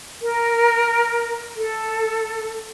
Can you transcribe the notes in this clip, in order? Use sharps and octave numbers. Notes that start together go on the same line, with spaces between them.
A#4
A4